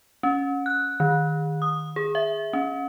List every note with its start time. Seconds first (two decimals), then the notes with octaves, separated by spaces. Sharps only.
0.23 C#4
0.66 F#6
1.00 D#3
1.62 D#6
1.96 G#4
2.15 E5
2.53 C#4